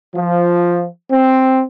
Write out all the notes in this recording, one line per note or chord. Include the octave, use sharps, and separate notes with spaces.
F3
C4